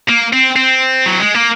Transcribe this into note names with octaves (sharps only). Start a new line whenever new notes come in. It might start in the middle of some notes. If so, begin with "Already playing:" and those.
A#3
C4
C4
F#3
G#3
A#3